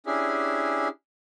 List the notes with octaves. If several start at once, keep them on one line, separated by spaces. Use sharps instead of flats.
C#4 D4 E4 G4 G#4